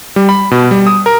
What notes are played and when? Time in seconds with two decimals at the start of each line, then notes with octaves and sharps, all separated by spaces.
0.16 G3
0.29 B5
0.51 B2
0.71 G3
0.87 D#6
1.06 A#4